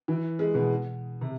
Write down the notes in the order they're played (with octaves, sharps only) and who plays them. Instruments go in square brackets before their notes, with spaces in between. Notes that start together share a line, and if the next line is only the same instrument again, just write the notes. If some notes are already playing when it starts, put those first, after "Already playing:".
[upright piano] E3
G#3
B2
C3